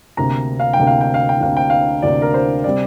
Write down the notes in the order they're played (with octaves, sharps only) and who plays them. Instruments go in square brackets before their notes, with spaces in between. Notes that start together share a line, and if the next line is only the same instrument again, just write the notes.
[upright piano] D2 C3 A#3 D4 A#5
F5
G5
D2 C3 A#3 D4
F5
G5
F5
G5
D2 C3 A#3 D4 F5
G5
F5
D2 C3 A#3 D4 D5
A#4
C5
C3 G3 C4 D5